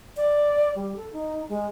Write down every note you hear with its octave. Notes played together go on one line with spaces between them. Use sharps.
D5
G3
A4
D#4
G#3